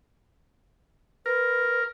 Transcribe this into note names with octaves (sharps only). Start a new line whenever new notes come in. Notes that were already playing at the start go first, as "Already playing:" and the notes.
A#4 B4